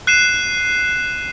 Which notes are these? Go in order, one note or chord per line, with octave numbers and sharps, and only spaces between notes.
F#6 C7 D#7 E7